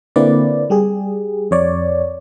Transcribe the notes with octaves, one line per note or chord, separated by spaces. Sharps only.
D3 A#3 C4 E4 B4 D5
G3 G4 G#4
F2 C#5 D5